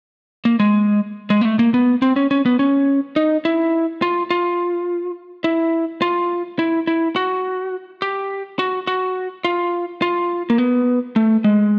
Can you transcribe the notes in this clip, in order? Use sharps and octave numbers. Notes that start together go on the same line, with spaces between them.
A#3
G#3
G#3
A#3
A3
A#3
B3
C4
C#4
C#4
B3
C#4
D#4
E4
F4
F4
E4
F4
E4
E4
F#4
G4
F#4
F#4
F4
F4
A#3
B3
A3
G#3